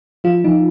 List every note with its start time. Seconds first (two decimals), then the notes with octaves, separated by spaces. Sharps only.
0.24 F3 F4
0.44 F3 D#4